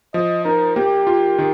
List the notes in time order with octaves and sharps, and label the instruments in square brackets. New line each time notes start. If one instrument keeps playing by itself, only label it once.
[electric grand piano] F3 [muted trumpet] D#5
[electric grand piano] D#4 [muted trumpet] A#4
[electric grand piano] A#3 [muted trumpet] G4
[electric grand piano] F4
D#3